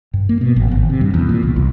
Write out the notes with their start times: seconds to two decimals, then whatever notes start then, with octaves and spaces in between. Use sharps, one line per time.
0.14 G2
0.29 A#3
0.41 B2
0.56 A1
0.71 G#1
0.90 C3
1.01 G2
1.14 E2
1.29 A#2
1.43 C2
1.56 C2